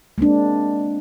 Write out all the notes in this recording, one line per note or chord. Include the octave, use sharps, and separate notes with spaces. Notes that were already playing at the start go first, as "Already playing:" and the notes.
G#3 A#3 C4 D4